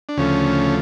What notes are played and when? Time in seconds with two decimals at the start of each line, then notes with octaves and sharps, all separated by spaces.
0.09 D4
0.17 D2 C#3 F3 A3 C#4